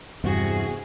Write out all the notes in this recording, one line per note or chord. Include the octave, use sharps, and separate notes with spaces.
E2 G2 C3 F#4 G#4